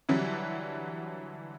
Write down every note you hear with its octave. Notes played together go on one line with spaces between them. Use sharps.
D3 E3 F#3 G3